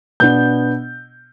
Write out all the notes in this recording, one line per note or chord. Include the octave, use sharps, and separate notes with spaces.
B2 B3 D4 G6